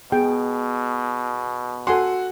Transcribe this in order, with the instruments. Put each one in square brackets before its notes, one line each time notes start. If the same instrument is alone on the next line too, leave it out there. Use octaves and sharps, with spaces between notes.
[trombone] B2 [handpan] B3 G#4 [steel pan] G5
[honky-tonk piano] F#4 [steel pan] A4 G#5 C6